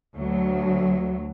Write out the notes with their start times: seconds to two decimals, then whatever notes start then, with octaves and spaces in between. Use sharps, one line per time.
0.16 D2 F#3